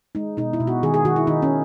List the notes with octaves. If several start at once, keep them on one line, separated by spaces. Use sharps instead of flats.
G#3 D#4
B2 D#4
E4
B2
F#4
D#3 G#4
G#4
D#3 F#4
E4
D#3 D#4
C#4